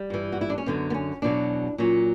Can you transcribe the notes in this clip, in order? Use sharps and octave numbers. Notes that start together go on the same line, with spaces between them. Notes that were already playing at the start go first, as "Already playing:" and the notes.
Already playing: G3
G2 E3
F#4
E4
D4
C#4
F#2 D3 F#3 B3
B3
C#4
E2 B2 F#3 D4
A#2 F#3 C#4